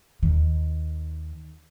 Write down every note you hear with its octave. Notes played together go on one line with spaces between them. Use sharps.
D#2 D#3